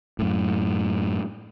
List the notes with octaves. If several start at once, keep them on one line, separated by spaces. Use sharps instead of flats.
F#2 A2